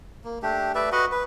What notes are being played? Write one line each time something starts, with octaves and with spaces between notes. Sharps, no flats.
A#3
A3 D4 G4
A3 B4 D5 E5
F#4 B4 D#5 F#5
B4